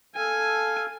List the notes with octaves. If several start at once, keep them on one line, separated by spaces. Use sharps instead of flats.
A4 F5 G#5